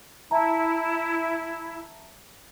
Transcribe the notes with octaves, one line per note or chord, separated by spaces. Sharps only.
E4 E5 A5 A#5